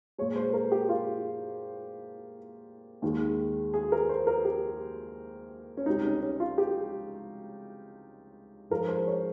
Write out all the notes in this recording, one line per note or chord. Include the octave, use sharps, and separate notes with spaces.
A#2 G#3 C#5
C5
A#4
G4
F4
D#2 D#3 G#3
G#4
A#4
C5
A#4
G4
C#4
C#2 C3 G3 D#4
C#4
C#4
F4
G4
G#2 F3 G#3 A#4
C5
C#5